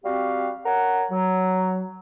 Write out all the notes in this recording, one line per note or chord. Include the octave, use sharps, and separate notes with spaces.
G3 C4 F#4 G4 F5
A#4 C#5 F#5
F#3